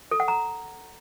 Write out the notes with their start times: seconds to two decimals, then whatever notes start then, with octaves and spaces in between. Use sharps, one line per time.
0.11 A4
0.20 F#5
0.28 A#5